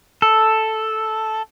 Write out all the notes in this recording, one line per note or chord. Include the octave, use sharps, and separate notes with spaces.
A4